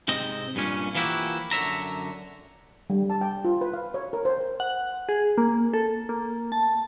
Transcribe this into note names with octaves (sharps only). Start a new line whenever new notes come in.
G#2 C3 C4 D#5
G2 A#2 C#4
E3 F3 A#3 E4 F#4 G4
F#2 D3 C#5 E5 A#5
G3
A5
G5
F4
B4
F5
C#5
A#4
C5
F#5
G#4
A#3
A4
A#3
A5